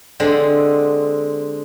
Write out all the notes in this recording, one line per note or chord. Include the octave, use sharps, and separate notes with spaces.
D3 G#3 C4